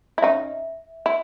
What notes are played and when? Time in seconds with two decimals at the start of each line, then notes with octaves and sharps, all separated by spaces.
0.18 E4
0.22 C#4 D#4 E5
1.06 E4